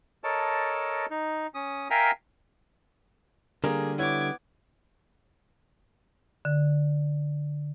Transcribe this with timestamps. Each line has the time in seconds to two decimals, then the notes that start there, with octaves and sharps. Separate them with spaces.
0.24 A4 A#4 C#5 D#5 A5
1.11 D#4
1.55 C#4 D#6
1.90 A#4 E5 F5 G5 G#5 A#5
3.64 D3 G3 A#3 G#4 A#4
3.98 B3 E4 C#5 D6 G#6
6.45 D3